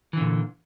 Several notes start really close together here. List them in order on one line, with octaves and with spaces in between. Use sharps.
E3 D3 A#2